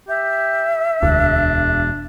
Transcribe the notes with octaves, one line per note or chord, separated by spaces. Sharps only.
G4 E5
E1 D2 D4